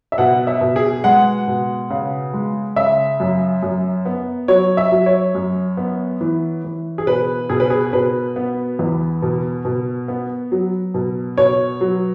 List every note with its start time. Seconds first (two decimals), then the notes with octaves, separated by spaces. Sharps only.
0.12 E5
0.18 B2 F#5
0.47 E5
0.61 B2
0.76 G#4
1.04 G#3 F#5
1.48 B2
1.90 C#3
2.33 G#3
2.76 C#3 E5
3.20 F#2
3.63 F#2
4.05 B3
4.48 F#3 C#5
4.77 E5
4.92 F#3
5.06 C#5
5.35 F#2
5.77 B3
6.21 E3
6.64 E3
6.98 G#4
7.07 B2 B4
7.50 B2 G#4
7.60 B4
7.70 G#4
7.93 B2 B4
8.36 B3
8.79 E2
9.22 B2
9.65 B2
10.08 B3
10.52 F#3
10.94 B2
11.38 B2 C#5
11.81 F#3